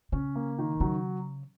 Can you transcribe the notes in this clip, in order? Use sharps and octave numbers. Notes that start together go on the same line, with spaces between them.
C#3 C#4
A#3
D#3
C#3 F#3